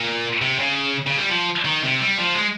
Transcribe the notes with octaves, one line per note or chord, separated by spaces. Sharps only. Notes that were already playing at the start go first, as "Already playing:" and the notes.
Already playing: A#2
C3
C#3
C#3
G3
F3
D#3
C3
G3
F3
G#3